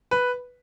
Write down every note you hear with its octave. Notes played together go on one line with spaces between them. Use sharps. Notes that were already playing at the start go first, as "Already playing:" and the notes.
B4